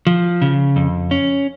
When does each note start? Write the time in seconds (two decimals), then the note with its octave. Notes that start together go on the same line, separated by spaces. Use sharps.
0.07 F3
0.42 C#3
0.76 F2
1.11 C#4